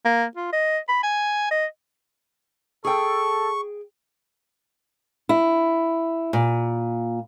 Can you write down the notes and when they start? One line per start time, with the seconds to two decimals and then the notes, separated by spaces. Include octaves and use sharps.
0.05 A#3
0.37 F4
0.53 D#5
0.89 B5
1.03 G#5
1.51 D#5
2.85 G#4 A4 G5 C#6
5.29 E4
6.33 A#2